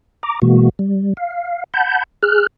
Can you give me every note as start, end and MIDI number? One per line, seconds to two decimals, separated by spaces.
0.23 0.39 82
0.23 0.39 86
0.42 0.69 47
0.42 0.69 52
0.42 0.69 56
0.42 0.69 58
0.42 0.69 66
0.79 1.14 55
1.17 1.64 77
1.74 2.03 78
1.74 2.03 81
1.74 2.03 83
1.74 2.03 91
2.23 2.47 68
2.23 2.47 89
2.23 2.47 90